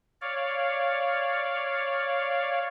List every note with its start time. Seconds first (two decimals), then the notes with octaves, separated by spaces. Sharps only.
0.21 C#5 D5 F5